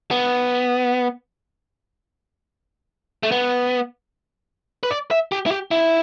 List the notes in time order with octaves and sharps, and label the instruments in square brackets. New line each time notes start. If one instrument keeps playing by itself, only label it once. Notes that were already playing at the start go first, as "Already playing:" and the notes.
[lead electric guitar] B3
A3
B3
B4
D5
E5
G4
E4
G4
E4